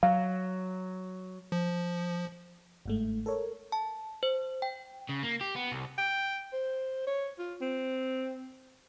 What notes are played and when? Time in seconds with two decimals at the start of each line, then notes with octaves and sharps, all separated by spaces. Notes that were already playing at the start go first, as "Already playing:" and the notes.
0.03 F#3 F5
1.52 F3
2.86 G1 G#2 A3
3.26 A4 A#4 C#5
3.72 A5
4.23 C5
4.62 G5
5.10 C#3
5.23 A#3
5.41 G4
5.56 B3
5.72 C2
5.98 G5
6.53 C5
7.07 C#5
7.39 F4
7.61 C4